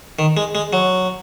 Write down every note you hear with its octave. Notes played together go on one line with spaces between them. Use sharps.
D#3
G#3
G#3
F#3